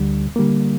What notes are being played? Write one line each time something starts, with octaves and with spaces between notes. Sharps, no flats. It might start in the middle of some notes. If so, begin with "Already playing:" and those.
Already playing: D2 D3 G3
D3 G3 A#3